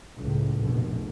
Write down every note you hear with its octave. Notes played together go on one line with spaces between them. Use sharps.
C#2 A2
F1 A#1 B2